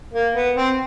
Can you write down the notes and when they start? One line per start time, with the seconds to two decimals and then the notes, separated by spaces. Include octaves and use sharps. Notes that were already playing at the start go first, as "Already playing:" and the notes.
0.14 A#3
0.35 B3
0.55 C4